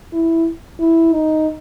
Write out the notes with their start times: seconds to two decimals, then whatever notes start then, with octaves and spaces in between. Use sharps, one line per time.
0.13 E4
0.79 E4
1.13 D#4